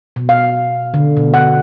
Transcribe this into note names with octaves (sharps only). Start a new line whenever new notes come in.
B2
F5
D3
B2
F#5